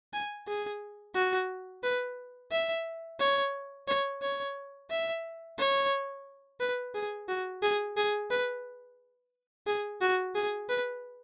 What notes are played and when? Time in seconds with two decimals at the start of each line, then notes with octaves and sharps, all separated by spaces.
0.13 G#5
0.47 G#4
1.15 F#4
1.83 B4
2.52 E5
3.20 C#5
3.88 C#5
4.22 C#5
4.90 E5
5.58 C#5
6.60 B4
6.95 G#4
7.28 F#4
7.63 G#4
7.97 G#4
8.31 B4
9.67 G#4
10.01 F#4
10.35 G#4
10.69 B4